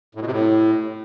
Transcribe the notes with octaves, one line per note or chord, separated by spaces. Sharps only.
A2
B2
C3
A2